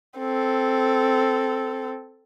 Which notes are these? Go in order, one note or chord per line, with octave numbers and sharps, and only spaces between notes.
C4 A4